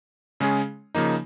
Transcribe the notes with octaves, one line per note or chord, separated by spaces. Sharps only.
C#3 G#3 C#4 G#4
C#3 F3 A#3 D#4